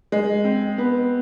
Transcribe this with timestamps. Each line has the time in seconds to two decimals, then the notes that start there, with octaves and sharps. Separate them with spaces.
0.12 G#3
0.44 C4
0.78 B3